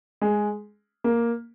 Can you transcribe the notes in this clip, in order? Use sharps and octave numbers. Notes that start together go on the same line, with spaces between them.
G#3
A#3